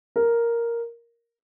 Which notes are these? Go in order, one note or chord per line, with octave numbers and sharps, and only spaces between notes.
A#4